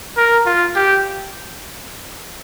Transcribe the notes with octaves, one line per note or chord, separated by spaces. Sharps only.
A#4
F4
G4